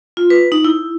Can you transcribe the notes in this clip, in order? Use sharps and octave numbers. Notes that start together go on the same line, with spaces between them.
F4
B4
D#4
E4